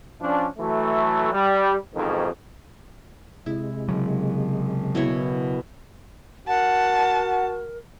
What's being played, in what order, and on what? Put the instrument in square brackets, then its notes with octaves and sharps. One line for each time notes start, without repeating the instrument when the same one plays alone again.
[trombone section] F3 C#4 D4
E3 F#3 A3
G3
A1 F2 G#2 B2 D#3
[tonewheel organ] C3 G#3 [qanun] E4
[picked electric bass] C#3 F#3
[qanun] B2 E4 C#5
[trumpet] F#4 [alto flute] A#4 [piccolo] F#5 [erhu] A5